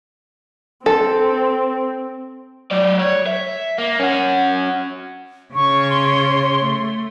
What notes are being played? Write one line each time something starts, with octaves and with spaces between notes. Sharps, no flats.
C4 A4
F#3 D5
C#5
E5
A#3
C#4 F#4
C#3 C#5 C#6
C6
A3